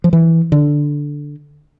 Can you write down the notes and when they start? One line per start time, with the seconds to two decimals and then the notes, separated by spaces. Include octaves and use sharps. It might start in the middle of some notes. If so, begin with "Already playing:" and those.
0.04 F3
0.13 E3
0.52 D3